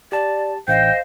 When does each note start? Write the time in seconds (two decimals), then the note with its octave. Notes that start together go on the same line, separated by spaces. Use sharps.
0.12 G4 D5 A5
0.68 A1 C5 D#5 F5 G5